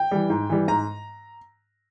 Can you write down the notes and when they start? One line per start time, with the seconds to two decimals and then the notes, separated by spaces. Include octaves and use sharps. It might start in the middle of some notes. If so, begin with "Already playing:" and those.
Already playing: G5
0.11 E3 G3
0.30 G#2
0.50 E3 G3
0.68 G#2 A#5